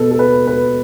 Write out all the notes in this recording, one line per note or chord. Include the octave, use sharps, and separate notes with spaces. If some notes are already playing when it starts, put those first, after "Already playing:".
Already playing: B2 A4 B4
A4
B4
B4